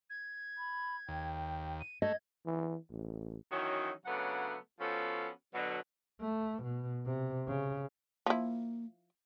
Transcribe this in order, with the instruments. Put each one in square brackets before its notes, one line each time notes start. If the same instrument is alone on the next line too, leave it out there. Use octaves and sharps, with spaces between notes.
[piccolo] G#6
[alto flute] B5
[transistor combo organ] D#2 [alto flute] G5
[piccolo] D#7
[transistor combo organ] A3 [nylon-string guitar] D#5 [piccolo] G#6
[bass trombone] E3
A1
[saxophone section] D#3 E3 F#3 C#4 D#4 F#4
C#3 F#3 A3 B3 D4 F#5
F3 B3 C#4 F#4 A4
B2 D3 F#3
[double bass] A3
B2
C3
C#3
[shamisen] F3 E4 [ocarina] A#3